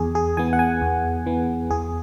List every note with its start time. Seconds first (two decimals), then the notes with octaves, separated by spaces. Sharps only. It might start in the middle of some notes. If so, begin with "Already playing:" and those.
Already playing: E2 G#4
0.15 G#4
0.37 E3 B3 G#5
0.53 F#5
0.59 G#5
0.81 E2
1.26 E3 B3
1.70 E2 G#4